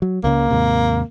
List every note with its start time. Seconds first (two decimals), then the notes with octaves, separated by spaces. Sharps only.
0.02 F#3
0.24 C#2 C#3 A#3
0.51 D#2 G#2 C3